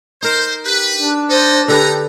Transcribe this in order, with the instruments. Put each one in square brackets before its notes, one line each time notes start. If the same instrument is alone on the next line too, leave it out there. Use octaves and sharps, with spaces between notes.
[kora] D#4 A#4 [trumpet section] C5
[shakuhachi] G4 [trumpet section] B4
[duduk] D4
[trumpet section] B3 A4 D#5 [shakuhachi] C5
[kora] D3 A4 B4 [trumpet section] D#4 A#5 [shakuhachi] G4